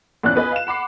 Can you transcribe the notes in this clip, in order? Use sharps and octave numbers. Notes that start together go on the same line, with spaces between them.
A#1 E2 C#4 D5 F#6
B3 B4 D#5 G#5
F5 E7
F#5 B5 D6 C7